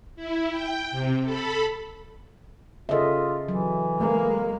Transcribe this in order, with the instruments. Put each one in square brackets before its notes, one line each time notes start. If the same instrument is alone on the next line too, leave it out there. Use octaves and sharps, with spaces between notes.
[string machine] E4
G5
C3
A4 B5
[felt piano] C#3 A4 [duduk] F4 [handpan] D#5 E5
[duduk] E3 [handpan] F#3
[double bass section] G#3 A#3